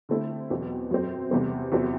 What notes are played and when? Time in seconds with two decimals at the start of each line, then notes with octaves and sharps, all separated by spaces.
0.09 D3 A3 C4 E4
0.50 E2 B2 F#3 C4
0.91 F#2 F#3 C4
1.31 E2 C3 G3 C4
1.72 E2 C3 F#3 C4 E4